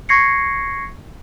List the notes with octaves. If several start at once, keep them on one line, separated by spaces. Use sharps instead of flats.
C#6 G#6 A#6 C7 C#7